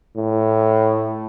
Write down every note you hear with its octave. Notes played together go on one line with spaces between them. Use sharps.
A2